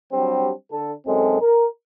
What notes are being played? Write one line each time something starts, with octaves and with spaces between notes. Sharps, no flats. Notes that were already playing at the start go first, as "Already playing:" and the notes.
F#3 G3 C4 D4 F#4 G4
D3 A4
B1 F#2 G#3 C4 A4
A#4